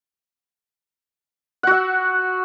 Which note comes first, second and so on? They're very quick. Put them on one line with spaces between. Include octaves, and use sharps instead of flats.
F#5 F#4 E5